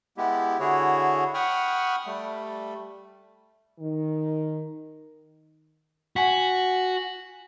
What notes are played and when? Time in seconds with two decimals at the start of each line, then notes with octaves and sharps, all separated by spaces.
0.17 G#3 B3 E4 G4
0.60 D3 E4 F#4 G#4 C#5
1.34 F#5 G5 B5 C#6 D#6 F6
2.06 G3 A3
3.79 D#3
6.16 F#4 F#5 G#5 B6